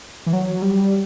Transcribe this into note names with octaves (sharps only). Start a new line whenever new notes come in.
E3
F#3
G3